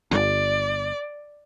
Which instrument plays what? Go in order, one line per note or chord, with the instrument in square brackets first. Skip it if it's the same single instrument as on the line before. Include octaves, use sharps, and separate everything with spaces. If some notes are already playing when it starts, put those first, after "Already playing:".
[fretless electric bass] G1 [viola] D5